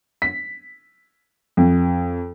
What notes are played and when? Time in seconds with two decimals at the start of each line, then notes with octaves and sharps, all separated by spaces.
0.22 B6
1.57 F2